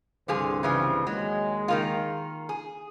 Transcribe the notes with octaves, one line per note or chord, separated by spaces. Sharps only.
C2 G2 D3 F3 G#4 C5
C#3 E3 F3
D#2 F#3 G#3
D#3 A#3 F4
G#4